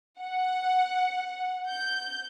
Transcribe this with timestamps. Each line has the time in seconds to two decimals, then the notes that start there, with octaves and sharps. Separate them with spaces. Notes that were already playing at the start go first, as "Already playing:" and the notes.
0.20 F#5
1.68 G6